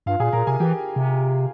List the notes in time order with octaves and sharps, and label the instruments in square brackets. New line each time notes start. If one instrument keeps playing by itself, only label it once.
[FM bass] G2 [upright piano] F4 F5
[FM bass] A#2 [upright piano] G#4 G#5
[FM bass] A#2 [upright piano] A#4 A#5
[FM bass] C3 [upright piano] G#4 G#5
[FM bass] E3 [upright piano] G4 G5
[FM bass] C3